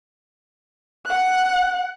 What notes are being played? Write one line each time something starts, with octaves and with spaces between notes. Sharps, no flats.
F#5 F#6